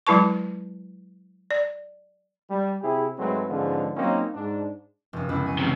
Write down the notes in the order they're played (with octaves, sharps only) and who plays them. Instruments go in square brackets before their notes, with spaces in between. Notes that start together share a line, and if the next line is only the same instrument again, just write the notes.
[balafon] F#3 G#3 E4 B4 A5 C#6
D5
[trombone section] G3
C3 E4 G4 G#4
G#2 F#3 G#3 A3 C4 B4
G#2 D3 F3 G#3 B3 C#4
F#3 A#3 C4 C#4 D#4
G#2 D4
[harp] F1 F#2
C#2 B3 E4
G#5 C#6
[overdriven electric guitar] E2 C3